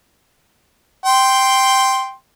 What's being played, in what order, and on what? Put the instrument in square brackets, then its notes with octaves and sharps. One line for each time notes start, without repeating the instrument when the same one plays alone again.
[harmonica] G5 C6